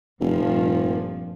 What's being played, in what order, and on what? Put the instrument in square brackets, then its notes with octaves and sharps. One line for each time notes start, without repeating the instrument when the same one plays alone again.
[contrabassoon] F1 [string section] G2 A#2 F3